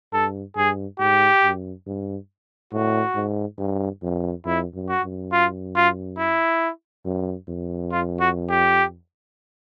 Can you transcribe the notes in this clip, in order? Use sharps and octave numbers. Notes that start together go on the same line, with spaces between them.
G2 A4
G2 G#4
G#2 G4
F#2
G2
A2 F#4
G#2
G2
F2
F2 E4
F#2
F#4
F#2
F4
F4
E4
F#2
F2
F4
F#4
G4